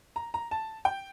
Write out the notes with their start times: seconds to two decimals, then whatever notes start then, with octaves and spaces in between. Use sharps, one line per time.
0.16 A#5
0.34 A#5
0.51 A5
0.85 G5